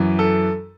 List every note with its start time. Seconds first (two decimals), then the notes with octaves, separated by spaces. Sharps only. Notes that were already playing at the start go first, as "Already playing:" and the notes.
Already playing: F#2 E3
0.19 A4